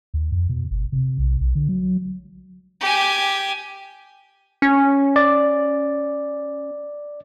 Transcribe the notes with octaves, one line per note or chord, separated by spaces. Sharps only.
D#2
F2
B2
G1
C3
B1
B1
D3
F#3
G4 G#5
C#4
D5